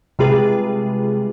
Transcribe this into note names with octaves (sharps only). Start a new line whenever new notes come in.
C3 G3 G#3 F4 G#4 B4